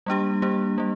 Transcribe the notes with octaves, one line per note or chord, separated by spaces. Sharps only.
G3 A#3 D4 G4
G3 A#3 D4 G4
G3 A#3